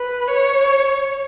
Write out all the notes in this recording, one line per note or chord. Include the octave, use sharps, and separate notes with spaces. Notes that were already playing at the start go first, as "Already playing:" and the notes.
Already playing: B4
C#5